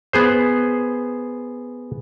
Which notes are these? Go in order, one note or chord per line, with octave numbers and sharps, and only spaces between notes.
B3 G#4 C5